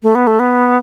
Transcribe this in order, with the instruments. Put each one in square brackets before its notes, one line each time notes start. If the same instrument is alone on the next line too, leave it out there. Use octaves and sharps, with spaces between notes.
[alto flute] A3
B3
A3
B3